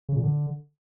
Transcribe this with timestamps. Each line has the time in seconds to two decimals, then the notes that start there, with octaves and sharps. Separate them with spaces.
0.09 C#3
0.16 A#2
0.23 D3